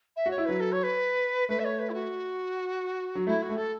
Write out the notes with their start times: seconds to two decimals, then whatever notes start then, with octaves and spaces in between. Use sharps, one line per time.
0.16 E5
0.26 F#4
0.30 C#5
0.38 E4
0.45 F#3 B4
0.60 A4
0.72 C#5
0.83 B4
1.48 A3 B4
1.59 E5
1.64 C#5
1.79 B4
1.89 E4
1.93 F#4
3.15 F#3
3.27 A3 E4
3.42 F#4
3.49 A3
3.56 A4